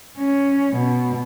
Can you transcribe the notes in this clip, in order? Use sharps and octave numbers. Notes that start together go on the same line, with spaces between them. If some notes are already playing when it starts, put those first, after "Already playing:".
C#4
B2